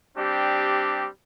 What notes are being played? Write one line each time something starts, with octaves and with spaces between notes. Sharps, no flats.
G3 C4 D4 G4